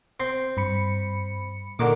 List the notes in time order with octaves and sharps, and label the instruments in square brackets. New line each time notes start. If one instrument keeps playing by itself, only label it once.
[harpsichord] C4 C6
[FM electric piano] G2 B5 C#7
[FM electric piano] A#2 [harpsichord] D3 D#3 D6